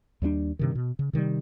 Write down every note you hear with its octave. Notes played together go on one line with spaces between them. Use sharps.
D#2 G3 G#3 D4
G2 C3 D#3
B2
C#3
C3 D#3 F#3 G3